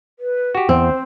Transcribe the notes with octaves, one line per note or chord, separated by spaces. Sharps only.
B4
F#4 G4
E2 C4 C5